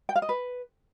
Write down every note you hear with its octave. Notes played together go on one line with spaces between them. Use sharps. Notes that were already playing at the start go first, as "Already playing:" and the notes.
G5
F5
D#5
B4